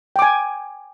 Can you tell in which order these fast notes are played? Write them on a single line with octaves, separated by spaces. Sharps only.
G5 D6 G#5